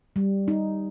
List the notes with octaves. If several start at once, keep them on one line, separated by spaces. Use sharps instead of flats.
G3
D#4